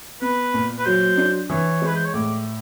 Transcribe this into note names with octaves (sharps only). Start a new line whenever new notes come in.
B3 B4
A#2
B4
F#3 C5
D4
E3 C#5
G#3 B4
C5
C#5
A2 D5